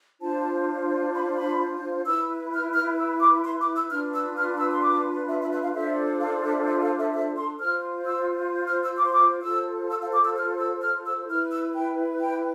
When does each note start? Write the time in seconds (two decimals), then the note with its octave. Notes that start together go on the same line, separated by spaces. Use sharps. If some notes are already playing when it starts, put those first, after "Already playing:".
0.20 D4 F4 C5 A5
1.13 B5
1.36 B5
2.05 E4 B4 E6
2.52 F6
2.72 F6
2.97 E6
3.20 D6
3.43 C6
3.59 D6
3.75 E6
3.90 D4 F4 B4 F6
4.12 E6
4.36 F6
4.59 E6
4.72 C6
4.82 D6
5.28 E5
5.40 E5
5.51 E5
5.62 F5
5.74 D4 F4 A4 C5 E5
6.20 F5
6.43 E5
6.66 E5
6.82 F5
6.97 E5
7.13 E5
7.36 C6
7.59 F4 C5 F6
8.05 E6
8.66 F6
8.82 E6
8.97 D6
9.05 C6
9.12 D6
9.43 F4 A4 C5 E6
9.90 E6
10.01 F5
10.13 D6
10.24 E6
10.36 F6
10.59 E6
10.81 F6
11.05 E6
11.27 E4 F6
11.31 B4
11.51 E6
11.74 G5
12.20 G5